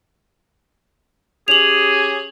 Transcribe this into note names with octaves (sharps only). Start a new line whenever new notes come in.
C#4 G4 G#4 F7 F#7